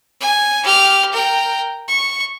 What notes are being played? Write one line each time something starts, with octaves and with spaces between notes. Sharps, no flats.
G#5
G4 F6
A#4 G5
C#6